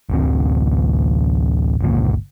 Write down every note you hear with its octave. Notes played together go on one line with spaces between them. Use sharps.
A1 D2 C4
G1 C#2 A#2